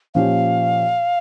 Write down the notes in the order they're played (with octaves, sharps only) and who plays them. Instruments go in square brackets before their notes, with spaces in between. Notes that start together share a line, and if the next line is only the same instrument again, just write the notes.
[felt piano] A#2 F3 C#4 G4 [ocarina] F5